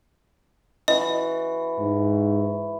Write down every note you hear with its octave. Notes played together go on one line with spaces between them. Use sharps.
E3 F#4 D#5
G#2